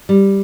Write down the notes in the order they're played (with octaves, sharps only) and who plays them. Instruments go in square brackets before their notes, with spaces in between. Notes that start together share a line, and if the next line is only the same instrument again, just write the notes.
[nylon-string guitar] G3